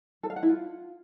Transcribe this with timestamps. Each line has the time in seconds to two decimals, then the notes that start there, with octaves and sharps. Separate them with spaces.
0.23 A4
0.30 F5
0.36 F#5
0.43 E4
0.49 F4